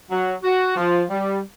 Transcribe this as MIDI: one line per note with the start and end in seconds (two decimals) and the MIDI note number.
0.11 0.34 54
0.44 0.76 66
0.77 1.04 53
1.10 1.40 55